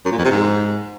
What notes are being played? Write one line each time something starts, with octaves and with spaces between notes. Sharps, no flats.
F#2
A#2
F2
C3
G#2